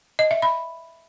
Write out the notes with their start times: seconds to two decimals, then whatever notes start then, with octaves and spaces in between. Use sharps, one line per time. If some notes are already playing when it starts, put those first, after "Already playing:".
0.19 D#5
0.31 E5
0.42 B5